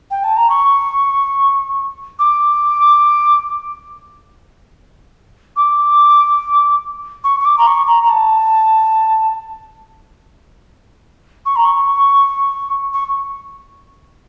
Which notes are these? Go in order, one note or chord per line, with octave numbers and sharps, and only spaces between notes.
G5
A5
A#5
C#6
D6
D6
C#6
C#6
D6
A#5
C#6
A#5
A#5
A5
C#6
A#5
C#6
C#6